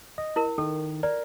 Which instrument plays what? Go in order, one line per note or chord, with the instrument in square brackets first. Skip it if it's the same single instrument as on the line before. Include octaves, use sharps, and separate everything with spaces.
[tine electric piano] D#5
[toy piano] E4 A#4
[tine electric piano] D#3 [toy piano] A4
[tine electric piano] A#4 [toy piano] D5